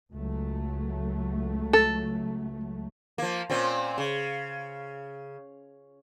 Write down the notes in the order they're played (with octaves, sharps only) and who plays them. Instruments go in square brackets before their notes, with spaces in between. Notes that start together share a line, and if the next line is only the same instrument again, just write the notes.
[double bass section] C#2 F#3 A3
[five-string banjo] A4
[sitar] F3 A#3
A#2 C4 C#4
C#3